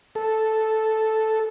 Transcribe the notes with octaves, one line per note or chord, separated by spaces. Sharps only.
A4